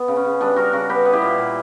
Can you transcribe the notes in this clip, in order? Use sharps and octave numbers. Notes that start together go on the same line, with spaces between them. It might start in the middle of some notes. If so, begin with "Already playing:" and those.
Already playing: B3
C#3
C#4
C#3
G3 B3 D4
G3 F#4 A#4
C#3 F#4 A#4
B3 G4 B4
B3
E4 G4
A#2
A#2